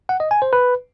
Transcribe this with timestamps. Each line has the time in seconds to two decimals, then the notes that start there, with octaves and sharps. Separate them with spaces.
0.09 F#5
0.20 D#5
0.31 G#5
0.42 C5
0.53 B4